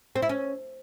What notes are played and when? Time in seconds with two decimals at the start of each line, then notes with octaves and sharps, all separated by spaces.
0.16 C4
0.22 E4
0.29 C#4